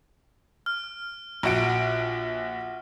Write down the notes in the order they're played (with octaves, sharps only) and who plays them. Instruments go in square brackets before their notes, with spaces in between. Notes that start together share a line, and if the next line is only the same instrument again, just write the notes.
[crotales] F6
[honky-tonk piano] A#1 F#4 D7